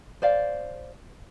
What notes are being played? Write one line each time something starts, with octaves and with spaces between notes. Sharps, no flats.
C5 D5 F5